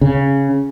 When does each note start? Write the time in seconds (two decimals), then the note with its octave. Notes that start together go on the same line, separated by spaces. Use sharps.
0.01 C#3